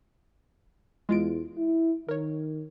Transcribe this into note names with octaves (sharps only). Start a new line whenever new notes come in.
E2 G#3 F4 D7
E4
D#3 A#4 C#5